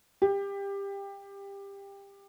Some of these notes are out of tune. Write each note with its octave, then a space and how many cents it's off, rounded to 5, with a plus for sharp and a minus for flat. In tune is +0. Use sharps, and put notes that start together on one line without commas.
G4 +20